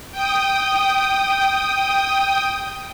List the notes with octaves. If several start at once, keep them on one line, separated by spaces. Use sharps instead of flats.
G5 D#6